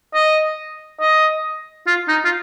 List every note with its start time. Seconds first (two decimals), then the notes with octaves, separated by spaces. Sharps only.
0.14 D#5
1.00 D#5
1.87 F4
2.08 D#4
2.24 F4